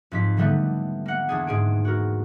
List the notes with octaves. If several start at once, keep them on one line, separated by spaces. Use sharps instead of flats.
F2 G#2 B6
D3 D#3 G3 A3 B3
A#3 F#5
E2 D4 G#4
G#2 G#4 D7
F#4 A#4